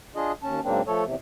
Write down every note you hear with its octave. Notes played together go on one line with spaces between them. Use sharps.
D4 F4 G#4 D#5
D#2 C#4 A5
G#2 C#3 F#3 A#3 C4 D4
F3 A3 A4 C#5
E2 C3